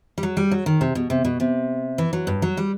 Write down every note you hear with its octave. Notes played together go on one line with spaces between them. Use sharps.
G3
F#3
G3
F#3
D#3
C3
B2
C3
B2
C3
E3
F#3
G2
F#3
G3